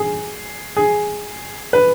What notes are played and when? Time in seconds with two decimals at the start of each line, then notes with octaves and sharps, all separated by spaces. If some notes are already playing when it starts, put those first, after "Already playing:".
Already playing: G#4
0.77 G#4
1.73 B4